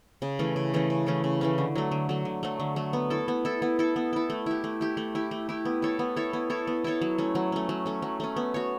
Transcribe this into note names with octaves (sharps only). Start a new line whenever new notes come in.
C#3
E3 A3 C#4
C#3
E3 A3 C#4
C#3
E3 A3 C#4
C#3
E3 A3 C#4
D3
F#3 A3
D3
F#3 A3
D3
F#3 A3
D3
F#3 A3
B3
E4 A4
B3
E4 A4
B3
E4 A4
B3
E4 A4
A3
E4 G4
A3
E4 G4
A3
E4 G4
A3
E4 G4
B3
E4 A4 C#5
B3
E4 A4 C#5
B3
E4 A4 C#5
B3
E4 A4 C#5
F#3
A3 C#4
F#3
A3 C#4
F#3
A3 C#4
F#3
A3 C#4
B3
F#4 C#5